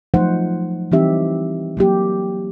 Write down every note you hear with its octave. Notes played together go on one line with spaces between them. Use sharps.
F3 F#3 A3 D#4 C5 F#5
E3 G3 C4 D#4 G4 E5
F#3 A#3 G4